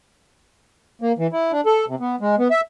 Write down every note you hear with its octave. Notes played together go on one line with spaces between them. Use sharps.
A#3
E3
E4
D4
A4
C3
B3
G#3
B3
E5